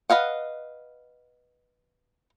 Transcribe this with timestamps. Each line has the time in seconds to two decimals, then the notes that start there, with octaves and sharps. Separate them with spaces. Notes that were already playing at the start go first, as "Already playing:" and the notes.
0.10 B4 D#5 F5 F#5